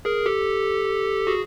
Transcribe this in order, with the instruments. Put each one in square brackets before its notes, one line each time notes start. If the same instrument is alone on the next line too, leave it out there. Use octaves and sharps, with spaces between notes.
[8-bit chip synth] G#4 A#4
G4 A4
F#4 G#4